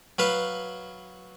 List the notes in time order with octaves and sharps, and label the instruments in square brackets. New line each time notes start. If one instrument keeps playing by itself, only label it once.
[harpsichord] F#3 B4 F5